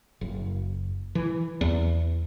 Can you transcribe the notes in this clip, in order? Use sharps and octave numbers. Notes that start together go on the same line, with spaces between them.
F#1
E3
E2